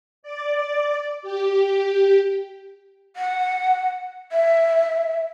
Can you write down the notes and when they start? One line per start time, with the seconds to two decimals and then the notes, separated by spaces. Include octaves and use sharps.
0.23 D5
1.22 G4
3.16 F#5
4.32 E5